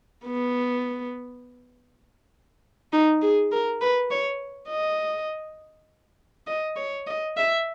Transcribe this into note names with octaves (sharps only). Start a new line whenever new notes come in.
B3
D#4
G#4
A#4
B4
C#5
D#5
D#5
C#5
D#5
E5